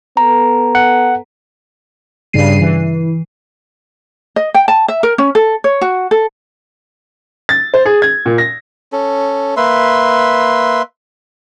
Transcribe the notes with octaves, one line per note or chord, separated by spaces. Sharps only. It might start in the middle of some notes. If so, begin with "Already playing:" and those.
B3 A4 A#5
F#5
G2 C#3 G3 C7 D#7
E3
D#5
G5
A5
E5
A#4
C#4
A4
C#5
F#4
A4
A6
C5
G#4
G#6
A#2
A#6
C#4 A4
A#3 B4 E5 C6